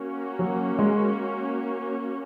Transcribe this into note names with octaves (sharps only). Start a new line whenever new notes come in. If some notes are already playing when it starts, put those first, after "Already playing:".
Already playing: A#3 C#4 F#4
F#3
G#3